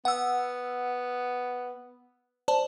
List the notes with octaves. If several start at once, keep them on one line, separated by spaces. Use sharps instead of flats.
B3 F#5 E6
C5 D5 A5